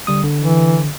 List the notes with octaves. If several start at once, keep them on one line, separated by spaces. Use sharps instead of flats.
D3 G3 D#6
D3
E3